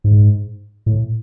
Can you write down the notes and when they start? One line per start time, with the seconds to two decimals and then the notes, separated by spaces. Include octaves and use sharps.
0.04 G#2
0.86 A2